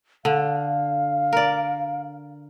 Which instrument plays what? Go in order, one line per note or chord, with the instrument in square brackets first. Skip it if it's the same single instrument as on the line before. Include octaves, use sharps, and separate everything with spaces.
[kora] D3 [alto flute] F5
[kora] A#4 D5